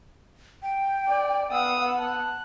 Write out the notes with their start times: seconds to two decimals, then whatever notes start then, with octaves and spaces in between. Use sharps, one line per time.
0.62 G5
1.08 D5
1.51 B3 F5 F#5 D#6 E6
1.98 A5 F#6